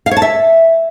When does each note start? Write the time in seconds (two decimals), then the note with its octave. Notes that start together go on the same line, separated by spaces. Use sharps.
0.06 F5
0.11 C#5
0.17 A5
0.22 E5